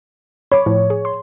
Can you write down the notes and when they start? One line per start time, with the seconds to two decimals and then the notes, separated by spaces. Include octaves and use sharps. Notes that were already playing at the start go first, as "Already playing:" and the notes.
0.52 C#5 B5 D6
0.66 A2 F3
0.90 G#4
1.05 C6